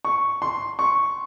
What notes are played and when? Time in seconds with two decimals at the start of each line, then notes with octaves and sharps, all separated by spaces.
0.05 C#6
0.42 C6
0.79 C#6